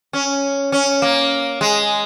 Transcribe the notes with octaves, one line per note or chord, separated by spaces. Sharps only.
C#4
C#4
A#3
G#3